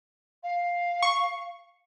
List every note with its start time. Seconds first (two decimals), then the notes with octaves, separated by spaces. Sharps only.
0.43 F5
1.03 C#6